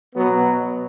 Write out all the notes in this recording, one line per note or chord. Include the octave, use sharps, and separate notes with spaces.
B2 F#3 B3